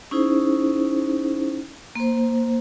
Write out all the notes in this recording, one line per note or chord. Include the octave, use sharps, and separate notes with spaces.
C#4 D#4 E4 G#4 C5
A#3 C5